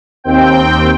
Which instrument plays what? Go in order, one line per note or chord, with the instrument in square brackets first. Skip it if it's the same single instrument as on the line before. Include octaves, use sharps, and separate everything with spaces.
[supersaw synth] D#2 C4 G5